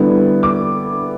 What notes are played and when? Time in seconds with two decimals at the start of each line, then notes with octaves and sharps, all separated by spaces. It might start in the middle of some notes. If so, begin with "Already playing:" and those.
Already playing: D3 G3 B3 E4
0.43 D6